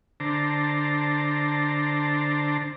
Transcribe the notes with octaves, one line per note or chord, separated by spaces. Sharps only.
D3 D4 C5 A5 A#5